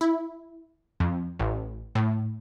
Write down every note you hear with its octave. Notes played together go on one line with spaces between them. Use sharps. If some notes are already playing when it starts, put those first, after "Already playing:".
E4
F2
A1
A2